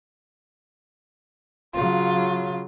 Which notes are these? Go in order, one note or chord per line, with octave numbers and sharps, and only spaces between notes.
C#3 F#3 F4